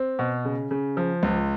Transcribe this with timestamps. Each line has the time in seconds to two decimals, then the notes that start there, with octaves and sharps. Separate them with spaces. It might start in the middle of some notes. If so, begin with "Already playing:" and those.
Already playing: C4
0.19 B2
0.45 C#3
0.71 C#3
0.97 F3
1.23 C#2